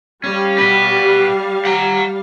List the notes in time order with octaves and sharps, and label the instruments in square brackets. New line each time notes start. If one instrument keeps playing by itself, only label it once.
[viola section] G3 F5 [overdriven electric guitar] C#4
[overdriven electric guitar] F#4 B4
F#5 A#5